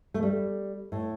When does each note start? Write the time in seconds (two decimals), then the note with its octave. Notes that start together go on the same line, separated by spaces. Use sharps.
0.14 A3
0.23 G3
0.92 A2